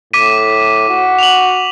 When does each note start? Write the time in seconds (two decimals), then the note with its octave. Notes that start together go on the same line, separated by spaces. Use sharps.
0.13 A2 D6 B6 D#7
0.89 F#4
1.18 F7 F#7